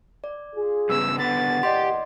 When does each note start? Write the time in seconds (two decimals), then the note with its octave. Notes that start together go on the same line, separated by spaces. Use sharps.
0.24 D5
0.55 F4 G#4
0.89 G2 C#3 B3 E6
1.19 E2 A#2 D3 B3 F#5 A6
1.63 G4 D5 D#5 C6